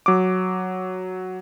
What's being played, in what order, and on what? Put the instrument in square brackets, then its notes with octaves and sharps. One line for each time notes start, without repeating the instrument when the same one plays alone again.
[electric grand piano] F#3 D6